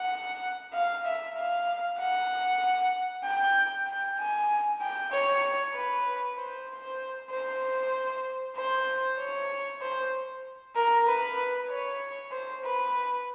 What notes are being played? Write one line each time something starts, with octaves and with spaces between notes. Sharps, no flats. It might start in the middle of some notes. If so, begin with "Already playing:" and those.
Already playing: F#5
F5
E5
F5
F#5
G5
G5
G#5
G5
C#5
B4
C5
C5
C5
C5
C#5
C5
A#4
B4
C#5
C5
B4